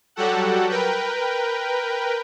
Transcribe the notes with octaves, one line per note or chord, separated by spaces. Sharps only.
F#3 G3 F#4 G4 A4 F#5
A#4 B4 G5